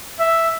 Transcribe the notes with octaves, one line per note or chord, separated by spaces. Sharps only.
E5